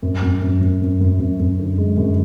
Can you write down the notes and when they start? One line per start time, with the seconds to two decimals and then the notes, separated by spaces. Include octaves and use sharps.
0.02 F#2
0.23 F#2
0.42 F#2
0.61 F#2
0.82 F#2
1.01 F#2
1.20 F#2
1.40 F#2
1.59 D3
1.78 G#3
1.97 F#2